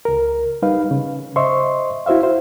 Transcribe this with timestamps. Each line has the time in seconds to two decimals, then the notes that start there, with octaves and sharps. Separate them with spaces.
0.05 C#2 A#4
0.62 G3 D#4 B4 F5
0.91 C#3
1.36 C5 D#5 E5 C6 C#6
2.06 E4 F#4 C5 E5 F5
2.23 C5